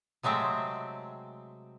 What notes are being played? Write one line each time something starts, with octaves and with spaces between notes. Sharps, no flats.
C3 F#3 G#3 A3 C4